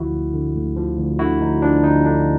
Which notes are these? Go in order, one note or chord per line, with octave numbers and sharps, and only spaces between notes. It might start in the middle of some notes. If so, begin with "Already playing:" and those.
Already playing: D2 D3 F3 E4 F#4
D2
D3
D2
F3
D2
D3 E4 F#4
D2 D#4
F3 D4
D2 D#4
D3 D4